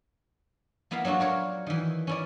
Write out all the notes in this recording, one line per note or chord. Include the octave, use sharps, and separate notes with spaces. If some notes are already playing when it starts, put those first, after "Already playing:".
A#3 B3 E4 E5 F5
F#3 D4 F4 F#4 A4
D4 A#4 C#5
D#3 E3
C#4 E4 D5